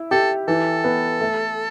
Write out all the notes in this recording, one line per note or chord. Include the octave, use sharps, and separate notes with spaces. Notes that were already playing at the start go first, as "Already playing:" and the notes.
Already playing: E4
G4 A4
E3 A4
B3
A3